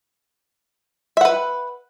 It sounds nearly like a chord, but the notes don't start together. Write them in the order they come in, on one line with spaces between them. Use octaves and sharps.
E5 F#5 B4